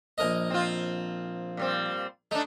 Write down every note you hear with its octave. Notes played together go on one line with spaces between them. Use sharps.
A#1 A#4 D#5
C4 F4
A#2 G3 C4
A3 D4 D#4